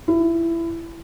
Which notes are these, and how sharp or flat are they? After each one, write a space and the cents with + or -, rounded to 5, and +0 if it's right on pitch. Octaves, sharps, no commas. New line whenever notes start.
E4 +20